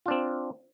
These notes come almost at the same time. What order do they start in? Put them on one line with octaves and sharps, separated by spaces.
F4 D4 C4